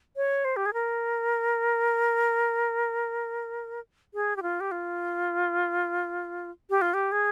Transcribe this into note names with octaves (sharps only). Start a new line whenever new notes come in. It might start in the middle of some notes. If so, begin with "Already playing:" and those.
C#5
C5
G4
G#4
A#4
G#4
G4
F4
G4
F4
G4
F4
G4
G#4